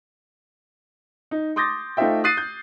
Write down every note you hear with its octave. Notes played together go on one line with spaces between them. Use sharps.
D#4
C6 D6 D#6 G6 A6 A#6
A3 D#4 F4 C5 E5 G5
D#6 F#6 A6 C7 D#7
G6